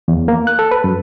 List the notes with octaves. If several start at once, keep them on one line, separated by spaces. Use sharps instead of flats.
E2
A#3
F#6
A4
B4
F#2